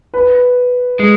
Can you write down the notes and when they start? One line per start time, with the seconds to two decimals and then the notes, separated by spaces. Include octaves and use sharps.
0.14 B4
1.00 G#3